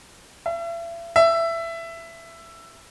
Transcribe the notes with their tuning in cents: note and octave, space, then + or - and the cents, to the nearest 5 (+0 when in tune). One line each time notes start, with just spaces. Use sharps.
E5 +40
E5 +15